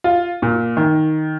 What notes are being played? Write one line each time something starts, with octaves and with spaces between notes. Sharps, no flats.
F4
A#2
D#3